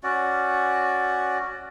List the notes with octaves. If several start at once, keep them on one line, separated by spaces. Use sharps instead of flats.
C#4 F#4 D5